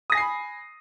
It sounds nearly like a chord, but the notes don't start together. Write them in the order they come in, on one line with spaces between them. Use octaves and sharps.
D#6 A#6 G#5 C7 B5